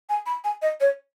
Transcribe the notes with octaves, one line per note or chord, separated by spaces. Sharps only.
G#5
B5
G#5
D#5
C#5